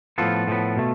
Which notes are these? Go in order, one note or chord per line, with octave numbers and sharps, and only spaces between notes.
A2 F3 B3 F4 A4
A2 F3 B3
B2 A3